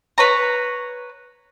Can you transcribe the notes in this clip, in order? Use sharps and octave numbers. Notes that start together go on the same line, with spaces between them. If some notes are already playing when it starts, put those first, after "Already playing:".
B4 C#5 A#5